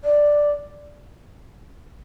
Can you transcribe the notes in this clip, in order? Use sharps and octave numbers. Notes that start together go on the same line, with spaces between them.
D5